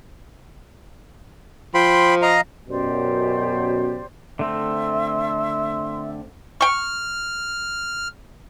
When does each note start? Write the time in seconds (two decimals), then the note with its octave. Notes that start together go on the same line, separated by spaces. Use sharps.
1.74 F3 G5 B5 C6
2.22 D#5 F5 A#5
2.69 F#2 B2 G4 C5 D5
4.39 D3 A3 C4 E5 C6
6.61 G5 C#6 F6